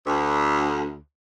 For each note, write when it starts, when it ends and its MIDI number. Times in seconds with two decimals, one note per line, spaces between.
0.07 0.96 38